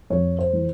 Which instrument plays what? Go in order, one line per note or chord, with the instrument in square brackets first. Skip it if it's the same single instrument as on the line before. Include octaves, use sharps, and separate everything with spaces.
[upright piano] F2 C#5
C5
E3